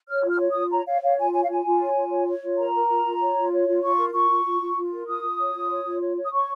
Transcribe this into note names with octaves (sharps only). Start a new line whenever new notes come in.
C#5 F6
F4
F6
C#5
F4 D#6
C#5 A#5
C#5 F5
C#5 F5
F4 G#5
C#5 G#5
F5
F4 G#5
F4
C#5
F4
C#5
C#5
F4
A#4 A#5
A#4
F4
F4
C#5
F4
C#5
F4
F4 C#6
A#4
F4 C#6
F4
F4
F4
F4
A#4
F4 D#6
F4
C#5
F4
C#5
F4
C#5
C#5
D#6
C#5 C#6